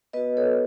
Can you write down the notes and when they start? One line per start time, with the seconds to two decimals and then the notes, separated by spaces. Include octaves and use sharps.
0.13 B3 F#4 B4 D#5
0.37 A4 C#5